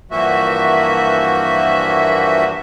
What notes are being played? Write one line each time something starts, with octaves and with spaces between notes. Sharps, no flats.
G2 E3 F3 A#3 F#4 E5